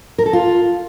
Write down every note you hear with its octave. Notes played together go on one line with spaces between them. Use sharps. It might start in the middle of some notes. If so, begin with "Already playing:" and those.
A#4
A4
F4